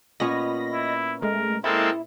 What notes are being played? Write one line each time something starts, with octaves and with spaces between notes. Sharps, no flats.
A#2 B3 C#4 D#5 B5 A#6
E4
G#3 A3 A#4
G#3 A#3 C4 E4 A4